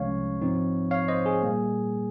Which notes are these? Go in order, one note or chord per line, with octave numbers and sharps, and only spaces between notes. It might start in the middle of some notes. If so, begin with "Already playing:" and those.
Already playing: C2 C3 F3 G#3 C#4 C#5 F5
G#2 F3 C4 D#4
C#5 F5
C5 D#5
G#4
A#2 G3 A#3